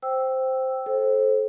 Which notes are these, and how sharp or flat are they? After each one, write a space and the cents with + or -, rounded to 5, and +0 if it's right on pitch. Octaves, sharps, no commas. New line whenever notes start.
C5 +0 G5 -10 E6 +0
A4 -25 C5 +20